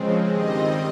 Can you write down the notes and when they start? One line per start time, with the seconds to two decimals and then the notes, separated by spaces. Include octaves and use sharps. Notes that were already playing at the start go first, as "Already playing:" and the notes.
Already playing: C#3 F3 G#3 C4
0.28 G2 D#3 G3 C4 D#5